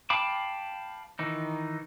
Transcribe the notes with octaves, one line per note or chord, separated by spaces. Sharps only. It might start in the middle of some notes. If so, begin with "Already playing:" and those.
F5 G5 A5 B5 D6
D#3 E3 D#4